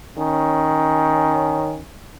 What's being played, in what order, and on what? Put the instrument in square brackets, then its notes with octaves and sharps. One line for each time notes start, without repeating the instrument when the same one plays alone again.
[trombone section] D#3 C#4